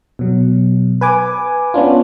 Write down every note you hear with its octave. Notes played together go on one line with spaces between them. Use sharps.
B2 F#3
B4 G#5 D6
B3 C#4 D4 F4